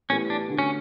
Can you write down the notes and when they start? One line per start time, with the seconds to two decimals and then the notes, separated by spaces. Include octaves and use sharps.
0.10 A2 E3 G3 B3 C#4
0.30 D4
0.50 D3 A3 D4 F#4
0.59 C#4